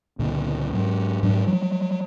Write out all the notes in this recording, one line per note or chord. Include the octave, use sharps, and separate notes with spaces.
C#2 A#2 D3
G#2 F#3
G#2 F#3 D4
F3 F#3